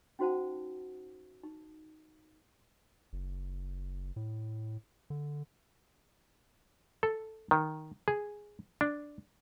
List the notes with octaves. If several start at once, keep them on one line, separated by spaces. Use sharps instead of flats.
C#4 D#4 F#4 C5 F#5 A5
D#4
F#1
A2
D3
A4
D#3
G#4
D4